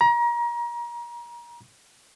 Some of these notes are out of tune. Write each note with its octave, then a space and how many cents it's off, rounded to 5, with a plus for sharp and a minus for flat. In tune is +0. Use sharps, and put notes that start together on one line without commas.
A#5 +30